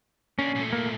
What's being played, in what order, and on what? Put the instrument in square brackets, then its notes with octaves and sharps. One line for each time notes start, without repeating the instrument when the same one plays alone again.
[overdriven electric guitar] A#3 D4 [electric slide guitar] C#4
[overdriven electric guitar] A#2 A3
[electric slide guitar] A#3